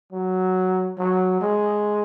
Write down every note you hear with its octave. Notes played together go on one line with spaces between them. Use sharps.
F#3
F#3
G#3